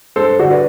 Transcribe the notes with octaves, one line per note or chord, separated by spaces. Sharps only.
G2 A4 C5
D3 D4 F#4
B4 D5